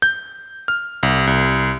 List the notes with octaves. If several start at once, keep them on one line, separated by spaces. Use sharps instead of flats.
G6
F6
C2
C2